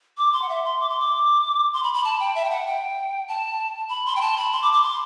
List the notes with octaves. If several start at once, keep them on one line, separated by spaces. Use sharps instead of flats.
D6
C6
F#5
E5
C6
D6
C6
D6
C6
B5
B5
A5
G5
E5
G5
F#5
G5
A5
B5
C6
G5
A5
B5
C6
D6
D6
C6